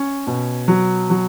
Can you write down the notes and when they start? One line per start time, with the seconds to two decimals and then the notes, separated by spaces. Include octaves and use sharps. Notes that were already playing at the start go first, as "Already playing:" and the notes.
Already playing: C#4
0.27 B2
0.68 F#3
1.10 F#3